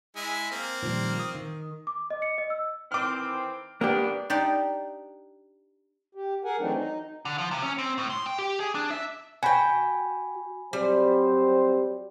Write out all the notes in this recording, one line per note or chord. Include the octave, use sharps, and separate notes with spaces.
G#3 E4 G#5
A#3 C4
A#2 D#3 F3 G3
D#6
D#3
D6
D#5
C#7
D#5
E6
D#3 E3 C4 D6 F6
G#2 D3 A#3 B3 D4 G4
D4 D#4 G4 D5
G4
G#4 A#4 F#5 G#5
E3 F#3 A3 C4 D4 D#4
D#4
D3
F3
C3
C#4
C4
A2
C6
G5
G4
G#4
D4
E5
F#4 G5 G#5 B5
F#3 G3 C4 C5